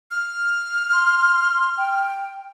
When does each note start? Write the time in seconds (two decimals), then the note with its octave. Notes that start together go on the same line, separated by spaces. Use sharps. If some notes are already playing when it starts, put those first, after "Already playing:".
0.11 F6
0.93 C6
1.77 G5